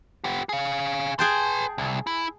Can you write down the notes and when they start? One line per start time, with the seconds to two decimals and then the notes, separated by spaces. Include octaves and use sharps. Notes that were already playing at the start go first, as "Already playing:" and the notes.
0.24 B3 G4
0.49 G#4 F5
1.19 G#4 B4 G5 A5 C6
1.78 C2
2.07 E4